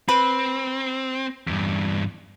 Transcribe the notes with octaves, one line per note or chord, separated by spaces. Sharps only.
C4 B4
E2 G2